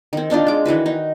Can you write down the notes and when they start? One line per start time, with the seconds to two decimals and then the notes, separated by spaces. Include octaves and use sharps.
0.13 D#3 C4
0.30 C4 D4 D#4 F4
0.47 G#3 D6
0.66 D#3 E3 F#4 B4
0.86 D#4